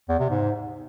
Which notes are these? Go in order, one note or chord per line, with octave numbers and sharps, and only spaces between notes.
E2
C3
G#2